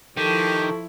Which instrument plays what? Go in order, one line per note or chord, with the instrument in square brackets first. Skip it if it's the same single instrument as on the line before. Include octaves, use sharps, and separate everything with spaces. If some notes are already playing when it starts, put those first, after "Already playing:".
[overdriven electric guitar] D#3 [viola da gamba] F3 E4 [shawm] G4 [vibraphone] A4 A5 C#6